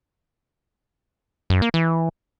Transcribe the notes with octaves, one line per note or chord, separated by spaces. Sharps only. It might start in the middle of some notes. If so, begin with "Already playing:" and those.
F#2
A#3
E3